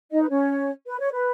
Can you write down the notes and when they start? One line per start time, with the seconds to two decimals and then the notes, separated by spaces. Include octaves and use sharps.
0.11 D#4 D#5
0.21 B4
0.30 C#4 C#5
0.87 B4
1.00 C#5
1.12 B4